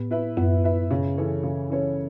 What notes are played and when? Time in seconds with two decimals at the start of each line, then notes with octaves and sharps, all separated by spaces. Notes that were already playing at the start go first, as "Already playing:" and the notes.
Already playing: A2 B3
0.11 E4 B4 E5
0.37 F#2 B3
0.64 E4 B4 E5
0.91 C#3
1.18 E3 C#4 A4 C#5
1.43 C#3
1.70 E3 C#4 A4 C#5